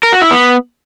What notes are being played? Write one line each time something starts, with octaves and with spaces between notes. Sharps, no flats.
A#4
F#4
E4
B3